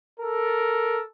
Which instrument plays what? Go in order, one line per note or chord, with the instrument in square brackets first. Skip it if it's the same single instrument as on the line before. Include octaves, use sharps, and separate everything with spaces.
[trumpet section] A4 A#4